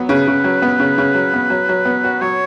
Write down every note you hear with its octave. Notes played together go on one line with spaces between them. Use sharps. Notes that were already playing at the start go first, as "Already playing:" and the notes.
Already playing: F#3 B3
C#3 B4
C#3
F#3
B3
C#3
C#3
F#3
B3
F#3
F#3
B3
F#4
F#3 C#5